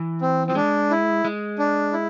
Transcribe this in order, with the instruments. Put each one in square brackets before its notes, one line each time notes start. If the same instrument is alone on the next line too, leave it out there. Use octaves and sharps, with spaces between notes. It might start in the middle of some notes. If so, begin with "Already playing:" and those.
Already playing: [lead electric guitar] E3
[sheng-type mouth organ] C4
[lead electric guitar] F3 [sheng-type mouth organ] C4
[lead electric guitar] G#3 [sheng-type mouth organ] D4
[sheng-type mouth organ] E4
[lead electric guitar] G#3
[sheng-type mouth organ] D4
E4